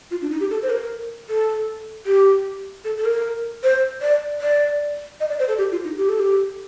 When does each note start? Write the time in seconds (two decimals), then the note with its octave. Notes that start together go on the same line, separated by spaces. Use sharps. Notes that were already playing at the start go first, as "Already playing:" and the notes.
0.11 F4
0.22 D4
0.31 D#4
0.40 G4
0.50 A4
0.62 C5
0.69 A#4
1.29 A4
2.06 G4
2.84 A4
2.98 A4
3.05 A#4
3.63 C5
4.01 D5
4.41 D5
5.20 D#5
5.29 D5
5.39 C5
5.48 A4
5.58 G4
5.71 F4
5.84 D#4
5.97 G4
6.09 A4
6.19 G4